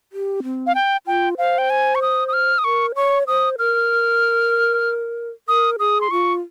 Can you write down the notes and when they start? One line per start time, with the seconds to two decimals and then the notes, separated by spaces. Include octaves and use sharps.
0.12 G4
0.43 C4
0.67 F5
0.75 G5
1.06 F4 G5
1.38 C5 F5
1.58 G5
1.70 G#5
1.95 C#6
2.02 D#6
2.28 D#6
2.33 F6
2.58 D#6
2.64 A#4 C#6
2.95 C#5 C#6
3.27 C5 D#6
3.59 A#4 F6
5.48 A#4 D#6
5.79 G#4 D#6
6.01 C6
6.11 F4 C#6